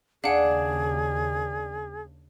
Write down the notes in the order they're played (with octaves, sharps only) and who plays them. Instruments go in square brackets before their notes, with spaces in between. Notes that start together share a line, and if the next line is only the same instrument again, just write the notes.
[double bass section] D#2 C#3 [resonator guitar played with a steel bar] D4 [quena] G#4 [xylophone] F5 F#5